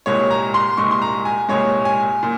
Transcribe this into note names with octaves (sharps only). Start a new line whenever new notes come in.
C2 A#2 G#3 C#5
A#5
C6
C2 A#2 G#3 C#6
C6
A#5
G#5
C2 A#2 G#3 C#5
G#5
A#2